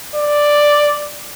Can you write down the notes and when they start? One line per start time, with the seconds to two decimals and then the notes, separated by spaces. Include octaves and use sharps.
0.15 D5